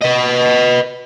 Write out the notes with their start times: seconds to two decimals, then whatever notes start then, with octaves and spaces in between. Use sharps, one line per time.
0.02 B4 D#5